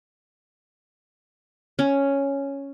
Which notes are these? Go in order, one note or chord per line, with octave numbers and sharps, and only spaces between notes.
C#4